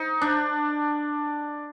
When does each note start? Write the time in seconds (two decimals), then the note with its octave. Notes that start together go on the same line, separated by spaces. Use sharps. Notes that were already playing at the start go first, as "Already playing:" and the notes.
Already playing: D#4
0.22 D4